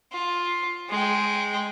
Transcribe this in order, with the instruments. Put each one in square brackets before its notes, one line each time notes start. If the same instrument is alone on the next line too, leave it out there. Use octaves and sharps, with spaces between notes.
[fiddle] F4
G#3 G5